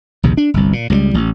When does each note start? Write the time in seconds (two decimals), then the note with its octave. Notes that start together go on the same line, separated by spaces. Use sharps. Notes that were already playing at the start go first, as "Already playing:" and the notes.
0.23 A#1 D#2 C3
0.37 D4
0.54 G1 C2
0.73 A#2
0.90 C#2 D3 G3
1.14 A1